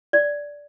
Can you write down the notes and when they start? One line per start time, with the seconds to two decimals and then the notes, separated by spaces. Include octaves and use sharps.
0.13 D5